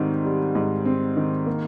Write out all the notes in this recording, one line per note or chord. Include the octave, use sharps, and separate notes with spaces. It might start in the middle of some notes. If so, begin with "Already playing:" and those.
Already playing: G#2 D#3 G3 C4
G3
G#2
C4
D#3
A#3